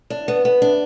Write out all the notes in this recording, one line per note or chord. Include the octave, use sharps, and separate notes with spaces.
D4
B3
B3
D4